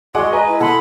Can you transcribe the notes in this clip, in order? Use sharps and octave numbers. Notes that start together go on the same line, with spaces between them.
G#3 F#4 D#5 F#5 C6 D6
B4 D#5 G#5 A#5
E4
B2 A4 F#5 B5 C6